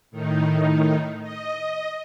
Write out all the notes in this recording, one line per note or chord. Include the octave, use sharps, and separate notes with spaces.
A2 D#3 D#4
D#5